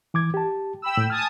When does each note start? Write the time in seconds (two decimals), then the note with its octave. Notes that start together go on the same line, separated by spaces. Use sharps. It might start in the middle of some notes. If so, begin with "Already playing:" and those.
0.14 E3 D6 G#6
0.34 G4 A5
0.82 G5 B5 E6
0.97 A2
1.10 G#5 A5 D#6 F6